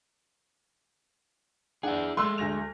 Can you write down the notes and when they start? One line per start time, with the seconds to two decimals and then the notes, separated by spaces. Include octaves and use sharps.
1.83 D4 E4 G#4 F#5
2.17 G#3 A3 C6 E6
2.38 D2 A#6 F7